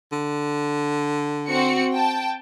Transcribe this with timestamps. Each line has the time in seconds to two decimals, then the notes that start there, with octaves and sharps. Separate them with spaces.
0.12 D3
1.48 C4 F#4 C#7
1.93 G5 A5